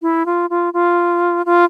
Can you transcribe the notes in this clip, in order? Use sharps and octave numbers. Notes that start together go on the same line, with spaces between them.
E4
F4
F4
F4
F4